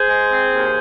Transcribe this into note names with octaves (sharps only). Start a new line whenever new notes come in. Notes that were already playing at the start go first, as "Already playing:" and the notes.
Already playing: G#4 C5
G#3
C4
D#2